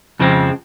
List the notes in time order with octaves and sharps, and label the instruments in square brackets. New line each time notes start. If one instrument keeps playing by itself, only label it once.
[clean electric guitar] F2 C#3 F3 G#3 C4